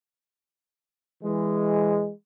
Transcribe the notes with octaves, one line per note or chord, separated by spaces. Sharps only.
E3 G#3